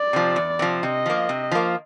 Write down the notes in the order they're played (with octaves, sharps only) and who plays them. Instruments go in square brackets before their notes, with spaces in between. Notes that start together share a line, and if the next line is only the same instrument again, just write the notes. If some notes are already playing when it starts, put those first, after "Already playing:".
Already playing: [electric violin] D5
[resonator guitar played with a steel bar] C3 F3
E2
C3 F3
[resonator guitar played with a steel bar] C3 [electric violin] D#5
[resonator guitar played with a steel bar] F3 A#3
C3
F3 A#3